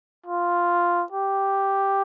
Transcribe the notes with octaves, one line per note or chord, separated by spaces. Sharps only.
F4
G4